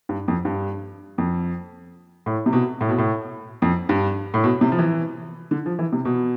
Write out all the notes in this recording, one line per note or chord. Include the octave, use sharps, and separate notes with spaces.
G2
F2
G2
F2
A2
C3
B2
A2
B2
A2
F2
G2
A2
B2
C3
F3
E3
D3
F3
E3
C3
B2